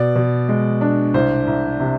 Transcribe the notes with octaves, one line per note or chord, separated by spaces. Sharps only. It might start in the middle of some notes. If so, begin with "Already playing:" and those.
Already playing: B2 D5
B2
G#3
D4
C2 C5
C2
C3